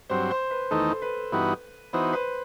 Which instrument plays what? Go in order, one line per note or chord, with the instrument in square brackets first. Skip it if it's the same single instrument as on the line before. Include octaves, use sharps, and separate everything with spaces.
[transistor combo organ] G2 F#3 C4 [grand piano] C5
[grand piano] C5
B4
[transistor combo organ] E2 D#3 A3 D#4 [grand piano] A4
[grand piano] B4
[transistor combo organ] G2 E3 B3 D#4 F#4
[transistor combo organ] E3 B3 D#4 F#4 [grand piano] C5
[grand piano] B4